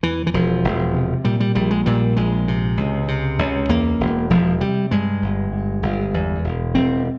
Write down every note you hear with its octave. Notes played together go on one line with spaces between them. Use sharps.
E2 E3
E3
E1 F3
E1
C3
A#2 G3
G3
A#1 G3
G#3
A#2 G3
A#1 G#3
C3
C#2
C3
C#2
E2 A#3
E1
E1 F3
C3 G3
G2 G#3
G1
G2
G1
E2
E1
E1 C4